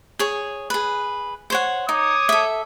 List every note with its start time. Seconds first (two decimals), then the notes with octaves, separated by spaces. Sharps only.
0.19 G#4 C#5
0.70 G#4 B4
1.50 C5 C#5 F#5
1.89 D#4 C#5 D6 D#6
2.29 A4 E5